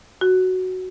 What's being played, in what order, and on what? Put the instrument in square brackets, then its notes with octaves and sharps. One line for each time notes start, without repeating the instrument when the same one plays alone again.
[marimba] F#4